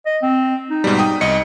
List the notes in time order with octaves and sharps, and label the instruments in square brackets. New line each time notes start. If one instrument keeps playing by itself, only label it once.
[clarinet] D#5
C4
D#4
[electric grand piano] G#2 B2 G3
G5 D#6
C2 D#5 C#7